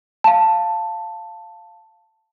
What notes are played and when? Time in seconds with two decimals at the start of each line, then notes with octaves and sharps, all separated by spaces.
0.24 F5 A5